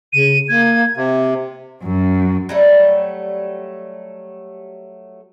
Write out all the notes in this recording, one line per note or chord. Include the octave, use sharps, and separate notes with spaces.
C#3 D#7
A#3 G#6
C3
F#2
F#3 G3 A3